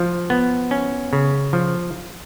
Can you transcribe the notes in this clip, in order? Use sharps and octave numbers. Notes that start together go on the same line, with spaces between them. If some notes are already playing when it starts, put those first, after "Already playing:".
Already playing: F3
B3
C#4
C#3
F3